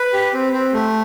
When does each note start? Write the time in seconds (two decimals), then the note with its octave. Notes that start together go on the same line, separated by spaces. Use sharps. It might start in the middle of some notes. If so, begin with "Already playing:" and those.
Already playing: B4
0.13 G4
0.34 C4
0.53 C4
0.74 A3